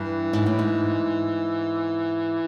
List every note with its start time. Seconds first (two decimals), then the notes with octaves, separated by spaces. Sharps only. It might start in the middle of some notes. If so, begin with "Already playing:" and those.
Already playing: G2 E3
0.33 G#2
0.46 A2
0.59 G#2